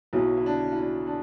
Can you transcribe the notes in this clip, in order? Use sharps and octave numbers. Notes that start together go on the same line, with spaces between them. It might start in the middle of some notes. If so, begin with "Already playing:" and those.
B1 B2 F#3 E4
E4
D4
E4
D4
D4